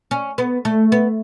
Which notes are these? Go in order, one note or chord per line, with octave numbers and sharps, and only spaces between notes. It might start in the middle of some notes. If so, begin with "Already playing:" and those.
C#4
B3
A3
B3